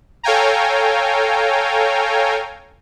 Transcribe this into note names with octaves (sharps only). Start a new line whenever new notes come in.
A4 C#5 F5 G5 G#5 A#5